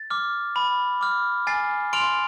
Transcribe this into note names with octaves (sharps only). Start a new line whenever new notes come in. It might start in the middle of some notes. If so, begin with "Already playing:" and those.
Already playing: A6
D6 F6
B5
D6 F6
G#5 A6 C7
C6 F6 D7 F7